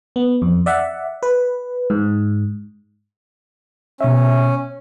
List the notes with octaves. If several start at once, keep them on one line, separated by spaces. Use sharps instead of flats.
B3
F2
D5 E5 F#5
B4
G#2
B2 C#4 E5